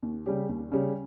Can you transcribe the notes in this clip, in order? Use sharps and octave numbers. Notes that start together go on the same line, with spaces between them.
D#2
C#3 G3 C#4 G4
D#2
C#3 G3 C#4 G4